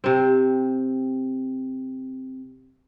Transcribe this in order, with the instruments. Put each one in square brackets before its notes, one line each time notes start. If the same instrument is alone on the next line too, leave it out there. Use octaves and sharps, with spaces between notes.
[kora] C3 C4